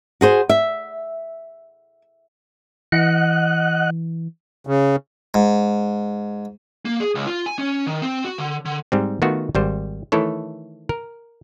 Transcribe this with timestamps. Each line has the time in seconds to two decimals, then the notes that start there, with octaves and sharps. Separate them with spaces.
0.21 F#4 G#4 C5
0.49 E5
2.92 E3 D#5 F#5 F#6
4.67 C#3
5.34 G#2
6.85 A#3
7.00 G#4
7.15 C#2
7.27 F4
7.46 G#5
7.58 C#4
7.87 D#3
8.02 C4
8.24 F#4
8.38 D3
8.65 D3
8.92 G#2 G3 C4
9.22 D#3 A3 B3 F4 F#4
9.55 G#1 G3 C5
10.12 D#3 E3 A3 E4 A4 C#5
10.89 A#4